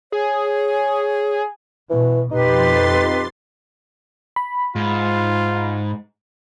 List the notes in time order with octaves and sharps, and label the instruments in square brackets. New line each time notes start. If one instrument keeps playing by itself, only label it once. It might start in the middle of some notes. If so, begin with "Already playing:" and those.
[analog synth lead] G#4 [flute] C#5
[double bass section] B2 [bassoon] E3
[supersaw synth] F2 C6 A6 [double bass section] B2 [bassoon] D#4 [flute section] G4 B4
[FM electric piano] B5
[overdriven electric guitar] G#2 [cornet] F4